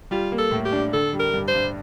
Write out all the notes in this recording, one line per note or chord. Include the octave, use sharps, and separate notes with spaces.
G3 F4
A#3
A4
A2
G4
D4
D3 A4
G3
A#4
G2
C5
G2